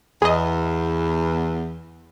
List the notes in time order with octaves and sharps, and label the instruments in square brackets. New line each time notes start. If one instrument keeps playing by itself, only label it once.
[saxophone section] E2 [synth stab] G#4 D#5